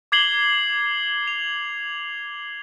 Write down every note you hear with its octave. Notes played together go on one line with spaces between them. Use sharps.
D6 G#6 C7 F#7 G7
F7